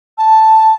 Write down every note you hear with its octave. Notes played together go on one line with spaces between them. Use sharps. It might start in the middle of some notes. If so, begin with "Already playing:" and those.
A5